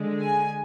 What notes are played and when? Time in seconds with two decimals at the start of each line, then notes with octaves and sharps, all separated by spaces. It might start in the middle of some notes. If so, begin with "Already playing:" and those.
Already playing: D3 G#3
0.20 G#5